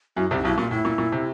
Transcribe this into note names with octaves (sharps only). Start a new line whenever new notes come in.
F#2 F#3 E4
C2 C3 F4
D#4
B1 B2 E4
A#2 F4
A2 E4
A#2
A#2
C3